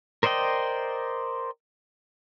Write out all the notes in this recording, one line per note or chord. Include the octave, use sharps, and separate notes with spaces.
A#4 C5 D5 D#5 G5